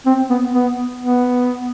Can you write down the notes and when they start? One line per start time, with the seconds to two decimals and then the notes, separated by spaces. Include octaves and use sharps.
0.06 C4
0.30 B3
0.53 B3
1.00 B3